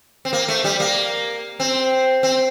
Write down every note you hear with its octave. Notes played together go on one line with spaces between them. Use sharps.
C4
A#3
A3
G3
A#3
C4
C4